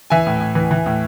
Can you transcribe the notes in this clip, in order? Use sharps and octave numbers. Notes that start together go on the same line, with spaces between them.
E3 E5 G#5
A2
A2
E3
E3
A2